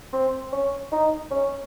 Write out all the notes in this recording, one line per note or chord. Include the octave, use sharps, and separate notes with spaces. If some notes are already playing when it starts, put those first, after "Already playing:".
C4
C#4
D#4
C#4